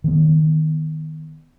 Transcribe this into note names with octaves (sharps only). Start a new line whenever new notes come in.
D#3 B3